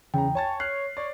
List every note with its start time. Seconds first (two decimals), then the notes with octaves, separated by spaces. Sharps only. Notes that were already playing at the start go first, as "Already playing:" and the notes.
0.14 E2 C#3 G5 A#5
0.35 C#5 G#5 A5 A6
0.60 F6 F#6 C7
0.97 C#5 D5